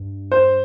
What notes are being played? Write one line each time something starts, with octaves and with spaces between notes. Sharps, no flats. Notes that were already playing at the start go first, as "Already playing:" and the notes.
Already playing: G2
C5